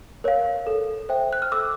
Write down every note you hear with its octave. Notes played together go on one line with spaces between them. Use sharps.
A#4 C#5 F5
A4
C5 E5 G5
F#6
F6
A4 D6 E6